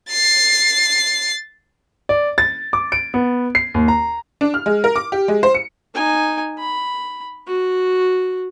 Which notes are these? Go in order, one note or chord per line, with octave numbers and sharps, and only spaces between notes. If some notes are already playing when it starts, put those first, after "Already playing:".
A6 C7
D5
A6
D6
D7
B3
C7
D#2
A#5
D4
F6
G#3
A#4
D6
G4
G#3
C5
C#7
D#4 G#5
B5
F#4